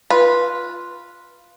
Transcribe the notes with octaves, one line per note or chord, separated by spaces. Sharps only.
F4 B4